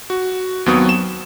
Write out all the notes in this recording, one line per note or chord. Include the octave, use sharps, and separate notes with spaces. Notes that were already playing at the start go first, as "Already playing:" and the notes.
F#4
D#2 F#3 B3 C4 C#6 D#6
E7